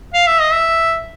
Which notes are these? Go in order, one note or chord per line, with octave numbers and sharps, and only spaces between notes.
F5
E5
D#5
E5